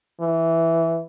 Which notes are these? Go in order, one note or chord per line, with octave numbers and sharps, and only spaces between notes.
E3